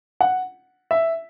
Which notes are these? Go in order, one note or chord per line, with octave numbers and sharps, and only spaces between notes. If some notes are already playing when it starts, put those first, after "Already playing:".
F#5
E5